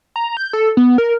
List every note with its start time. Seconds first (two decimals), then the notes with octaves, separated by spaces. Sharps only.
0.16 A#5
0.37 G6
0.53 A4
0.77 B3
0.98 A#4